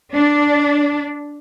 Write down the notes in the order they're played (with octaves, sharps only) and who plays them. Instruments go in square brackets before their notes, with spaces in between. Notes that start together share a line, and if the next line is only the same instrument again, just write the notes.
[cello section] D4